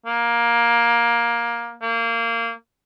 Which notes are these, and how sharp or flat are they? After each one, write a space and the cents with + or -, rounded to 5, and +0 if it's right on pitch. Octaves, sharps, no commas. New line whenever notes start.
A#3 +15
A#3 -20